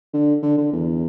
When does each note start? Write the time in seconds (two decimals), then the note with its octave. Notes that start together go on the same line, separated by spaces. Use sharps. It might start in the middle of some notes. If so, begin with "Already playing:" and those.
0.13 D3
0.42 D3
0.58 D3
0.72 E2